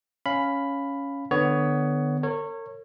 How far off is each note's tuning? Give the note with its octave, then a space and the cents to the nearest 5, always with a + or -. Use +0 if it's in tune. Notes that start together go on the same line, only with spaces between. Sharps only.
C#4 +5 F5 +0 B5 +5
D3 +35 B3 +10 C#5 +20
A#4 -40 C#5 -15